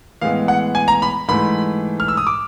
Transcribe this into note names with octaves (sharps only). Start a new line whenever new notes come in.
A2 E3 G#3 B3 F5
F#5
G#5
A#5
B5
G#2 E3 A3 B5
F6
E6
D#6
D6